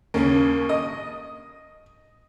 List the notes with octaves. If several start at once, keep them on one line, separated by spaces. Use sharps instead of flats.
D#2 C#3 A#3 C#4
D#5 D#6